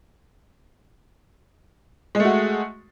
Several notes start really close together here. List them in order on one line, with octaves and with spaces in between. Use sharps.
G#3 A3 F#4